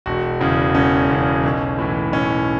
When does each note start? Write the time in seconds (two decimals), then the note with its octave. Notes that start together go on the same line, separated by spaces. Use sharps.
0.06 E1 F#4
0.40 E2 C#3
0.74 E1 C#4
1.09 E2 C#3
1.43 B1
1.79 A2 E3
2.12 B1 C#4